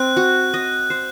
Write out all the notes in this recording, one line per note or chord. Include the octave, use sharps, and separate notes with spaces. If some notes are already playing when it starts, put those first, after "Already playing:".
Already playing: C4 C5 F#6
F#4
D#5
C5